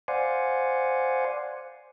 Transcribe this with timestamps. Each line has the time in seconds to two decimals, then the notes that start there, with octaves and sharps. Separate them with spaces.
0.08 C5 D5 F5 F#5 G#5